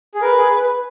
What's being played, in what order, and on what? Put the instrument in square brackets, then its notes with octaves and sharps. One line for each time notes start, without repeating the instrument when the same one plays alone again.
[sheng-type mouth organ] G#4
[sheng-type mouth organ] A#4 [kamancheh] B4
[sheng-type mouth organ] G#4